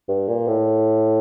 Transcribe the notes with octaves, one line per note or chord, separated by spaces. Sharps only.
G2
A#2
A2